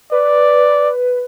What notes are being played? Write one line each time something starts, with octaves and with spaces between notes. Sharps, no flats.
B4 D5